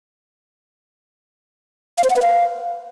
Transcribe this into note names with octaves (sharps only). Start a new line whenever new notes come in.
F5
C5
F#5
B4
F5